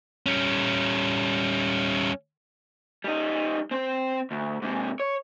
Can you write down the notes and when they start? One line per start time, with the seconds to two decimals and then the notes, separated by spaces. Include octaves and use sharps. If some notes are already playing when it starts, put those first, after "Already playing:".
0.26 G3 C#4
3.04 G3 D#4
3.71 C4 C5
4.31 D2
4.62 G#2 C3
5.00 C#5